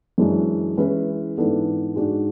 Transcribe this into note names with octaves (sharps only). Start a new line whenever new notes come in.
F#2 E3 G#3 D4
E3 G#3 C#4 E4 B4
G#2 E3 B3 D4 A4
G#2 G#3 D4 F#4